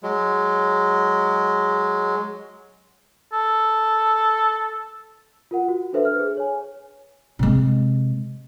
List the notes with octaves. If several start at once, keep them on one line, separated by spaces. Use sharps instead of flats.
F#3 G#3
A4
F4 A#4 F#5
F#4
D4 A4 B4 C5 E5
F6
G#4
C#5 G#5
C3 G#3